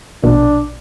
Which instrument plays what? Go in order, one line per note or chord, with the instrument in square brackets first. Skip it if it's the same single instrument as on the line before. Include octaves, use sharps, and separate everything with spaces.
[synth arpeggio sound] A#1 B2 [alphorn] D4